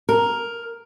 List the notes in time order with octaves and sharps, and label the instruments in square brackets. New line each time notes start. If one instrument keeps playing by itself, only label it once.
[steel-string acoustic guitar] A#4